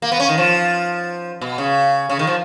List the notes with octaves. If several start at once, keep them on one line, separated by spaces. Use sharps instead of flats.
A#3
B3
C#4
D#3
F3
B2
C#3
C#3
D#3
F3